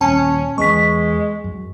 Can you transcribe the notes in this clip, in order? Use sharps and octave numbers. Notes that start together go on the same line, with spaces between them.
D#1 C#4 A5
E2 G#3 B3 C#6 B6
F#2